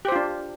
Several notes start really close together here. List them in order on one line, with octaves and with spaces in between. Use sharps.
G4 C5 F4 D4